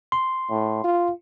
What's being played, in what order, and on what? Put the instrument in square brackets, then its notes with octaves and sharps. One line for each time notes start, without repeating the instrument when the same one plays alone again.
[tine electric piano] C6
[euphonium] A2
F4